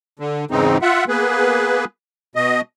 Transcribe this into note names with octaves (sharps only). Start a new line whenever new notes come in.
D3
E2 G#2 C#3 E3 C4 D#4
F4 E5 F#5
A#3 B3 G#4 B4
B2 D#5